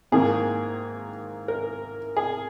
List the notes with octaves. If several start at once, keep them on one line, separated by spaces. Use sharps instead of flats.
G#2 D#3 A#3 G#4
A#4
G#4